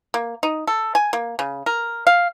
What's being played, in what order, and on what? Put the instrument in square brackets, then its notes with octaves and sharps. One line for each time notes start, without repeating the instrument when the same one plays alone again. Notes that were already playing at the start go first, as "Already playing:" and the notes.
[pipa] A#3
D#4
A4
G#5
A#3
C#3
A#4
F5